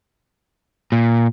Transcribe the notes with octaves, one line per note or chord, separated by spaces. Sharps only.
A#2